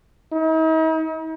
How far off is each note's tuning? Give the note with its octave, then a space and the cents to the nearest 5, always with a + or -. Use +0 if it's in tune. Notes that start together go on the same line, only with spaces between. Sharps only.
D#4 +45